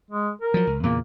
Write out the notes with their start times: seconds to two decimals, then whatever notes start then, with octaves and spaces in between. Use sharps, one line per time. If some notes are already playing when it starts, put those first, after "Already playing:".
0.11 G#3
0.41 A#4
0.54 F3 F#3
0.67 C#2
0.83 E2 A#2 C#3 A#3